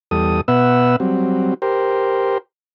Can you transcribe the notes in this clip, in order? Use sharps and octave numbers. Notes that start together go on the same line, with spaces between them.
E2 G3 A4 D#6
B2 B3 B4 E5 F#5 E6
F#3 G3 C4
G4 A#4 C5